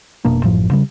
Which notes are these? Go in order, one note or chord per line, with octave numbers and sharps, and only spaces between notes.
F1 B2 A#3 D4
A1 F#2 A2 F3
C#3 G3